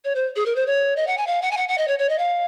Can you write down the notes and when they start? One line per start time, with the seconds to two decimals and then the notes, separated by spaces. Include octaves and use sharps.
0.04 C#5
0.15 C5
0.36 G#4
0.46 A#4
0.56 C5
0.67 C#5
0.96 D#5
1.07 F#5
1.17 G#5
1.27 F5
1.42 F#5
1.51 G#5
1.57 F#5
1.68 F#5
1.78 D#5
1.88 C#5
1.99 C#5
2.09 D#5
2.18 F5